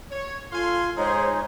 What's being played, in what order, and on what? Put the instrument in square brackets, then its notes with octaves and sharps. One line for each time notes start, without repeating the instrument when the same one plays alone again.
[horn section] C#5
[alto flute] F4 [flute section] A4 [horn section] F5 G#5 C6
[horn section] G#2 G#4 [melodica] G#3 D#4 [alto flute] C5 [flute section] C#5